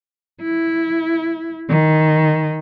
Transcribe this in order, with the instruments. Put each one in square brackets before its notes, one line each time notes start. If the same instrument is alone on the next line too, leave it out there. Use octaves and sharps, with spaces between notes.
[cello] E4
D#3